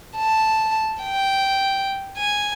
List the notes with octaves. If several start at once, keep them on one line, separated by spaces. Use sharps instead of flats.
A5
G5
G#5